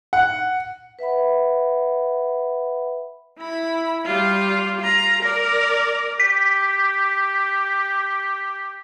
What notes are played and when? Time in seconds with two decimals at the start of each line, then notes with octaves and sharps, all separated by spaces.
0.13 F#5
0.99 B4 E5 F#5 B5
3.38 E4 B5
4.05 G3 F4
4.80 F4 A#5
5.23 A#4 D5
6.20 G4 B6